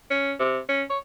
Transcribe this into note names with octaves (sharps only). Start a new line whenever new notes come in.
C#4
C3
C#4
C#5